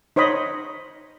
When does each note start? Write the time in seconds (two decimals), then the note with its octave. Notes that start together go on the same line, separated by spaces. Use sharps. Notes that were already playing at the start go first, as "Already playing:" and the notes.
0.16 D#4 C5 C#5 D#5 B5